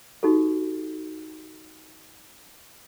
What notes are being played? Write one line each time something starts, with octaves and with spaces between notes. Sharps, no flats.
D#4 F#4 G4 A4